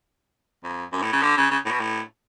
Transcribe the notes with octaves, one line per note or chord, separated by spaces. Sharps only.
F2
F#2
A2
C#3
D3
C#3
C#3
A2
B2
A2